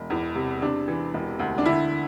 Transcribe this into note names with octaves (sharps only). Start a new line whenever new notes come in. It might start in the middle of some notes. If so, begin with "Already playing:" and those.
Already playing: E1
E2
C3
C3 D4
E3
E1
D2
D4
D3 E4